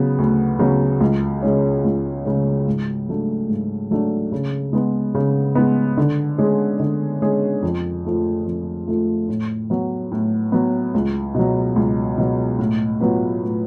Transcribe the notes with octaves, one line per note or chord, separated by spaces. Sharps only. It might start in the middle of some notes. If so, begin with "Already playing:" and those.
Already playing: C#3 F#3 B3
D2
C#3 F#3 B3
C#2
C#3 G#3 C#4
C#2
C#3 G#3 C#4
G#2
F#3 A3 D4
G#2
F#3 A3 D4
C#3
G#3 B3
C#3
G#3 B3
D3
G#3 C#4 G#4
D3
G#3 C#4 G#4
F2
F3 A3 F4
F2
F3 A3 F4
A2
F#3 B3
A2
F#3 B3
C#2
B2 F#3
C#2
B2 F#3
A2
F#3 B3 F4 B4
A2